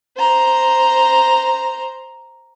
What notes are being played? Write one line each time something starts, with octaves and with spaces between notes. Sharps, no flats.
C5 A#5